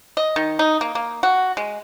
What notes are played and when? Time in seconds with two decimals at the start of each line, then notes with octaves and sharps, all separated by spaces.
0.17 D#5
0.36 D#3
0.59 D#4
0.81 A#3
0.95 A#3
1.23 F#4
1.57 G#3